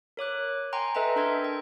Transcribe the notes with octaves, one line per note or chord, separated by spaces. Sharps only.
A#4 C#5 D6 F#6
G5 G#5 A#5 C6
A4 B4 D#5 E5 G5 A#5
D4 A4 A#4 G5 C6 G#6
G5